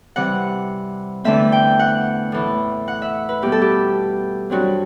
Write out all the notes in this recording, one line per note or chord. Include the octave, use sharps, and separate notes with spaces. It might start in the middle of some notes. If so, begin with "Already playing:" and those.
C3 E3 G3 C4 F#5
E2 D3 A3 C4 E5
G5
F#5
A2 E3 A3
F#5
E5
B4
B2 G3 B3 G4
A4
G4
G2 F#3 C4 F#4